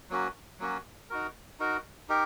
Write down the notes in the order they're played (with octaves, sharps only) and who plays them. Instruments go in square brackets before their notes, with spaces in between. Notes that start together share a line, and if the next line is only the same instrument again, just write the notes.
[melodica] F#3 A#3 C#4 F#4
F#3 A#3 C#4 F#4
D#4 F#4 A#4
D#4 F#4 A#4
D#4 G4 A#4